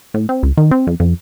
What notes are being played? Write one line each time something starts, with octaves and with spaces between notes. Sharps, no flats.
A2
C4
C#2
D#3
C4
F2
F2